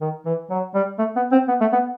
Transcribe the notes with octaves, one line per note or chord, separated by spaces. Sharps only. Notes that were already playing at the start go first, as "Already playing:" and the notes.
D#3
E3
F#3
G3
A3
B3
C4
B3
A3
B3